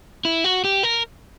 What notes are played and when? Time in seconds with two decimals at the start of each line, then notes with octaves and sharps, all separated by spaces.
0.25 E4
0.44 F#4
0.64 G4
0.83 A#4